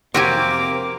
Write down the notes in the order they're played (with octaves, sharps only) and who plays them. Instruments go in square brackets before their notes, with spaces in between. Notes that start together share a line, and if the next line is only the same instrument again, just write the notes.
[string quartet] F2 A#3 D6 [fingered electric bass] C3 [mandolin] C4 [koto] F#4 G4 G#5